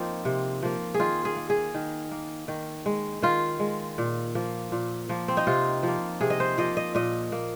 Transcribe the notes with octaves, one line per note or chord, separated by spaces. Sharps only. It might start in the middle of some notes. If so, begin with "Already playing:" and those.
Already playing: F3 A#3 C4 D#4
C3
F3 A#3
G#4
D#3 F4
G#4
A#3
G#4
D#3
A#3
D#3
G#3
D#3 F4
G#3
A#2
F3 A#3
A#2
F3 A#3
C4
D#4
C3 F4
F3 A#3
C3 G#4
D#5
C5
F3 A#3 D#5
D#5
A#2 D#5
A#3